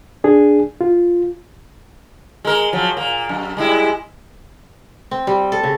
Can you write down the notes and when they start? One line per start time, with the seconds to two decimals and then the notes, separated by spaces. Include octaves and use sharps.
0.24 D4 G#4
0.81 F4
2.45 G#3 A#4
2.73 F3 F#3
2.97 A#2 A#3
3.29 F#2
3.57 G3 G#3 E4
5.11 C4
5.27 G3
5.52 A4
5.63 C#3